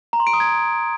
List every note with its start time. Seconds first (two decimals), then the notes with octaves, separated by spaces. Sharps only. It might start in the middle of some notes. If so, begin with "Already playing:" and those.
0.13 A#5
0.20 C6
0.27 D7
0.33 D#6
0.40 G#6